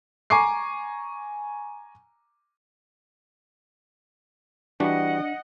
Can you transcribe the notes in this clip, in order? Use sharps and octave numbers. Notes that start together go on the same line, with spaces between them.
G#5 A#5 C#6 D6 C7
E3 G3 D4 F#4 D#5 F#5